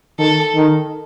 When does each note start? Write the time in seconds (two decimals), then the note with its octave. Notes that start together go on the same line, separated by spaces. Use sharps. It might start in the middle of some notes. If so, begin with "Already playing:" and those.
0.19 D#3 A4
0.56 D#3